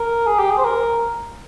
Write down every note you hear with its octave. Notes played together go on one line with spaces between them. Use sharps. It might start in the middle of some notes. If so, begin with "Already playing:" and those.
Already playing: A#4
G#4
G4
G#4
C5
A#4